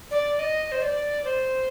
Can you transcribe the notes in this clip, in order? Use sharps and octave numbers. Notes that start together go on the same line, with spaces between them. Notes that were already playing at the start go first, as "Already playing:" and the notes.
D5
D#5
C5
D5
C5